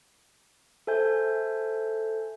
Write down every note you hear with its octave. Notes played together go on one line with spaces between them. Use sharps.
A4 C5 E5 G#5 G6